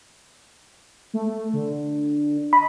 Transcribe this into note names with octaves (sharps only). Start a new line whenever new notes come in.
A3
D3
D#5 B5